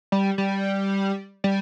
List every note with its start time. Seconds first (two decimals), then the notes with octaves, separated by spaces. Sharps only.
0.12 G3
0.38 G3
1.44 G3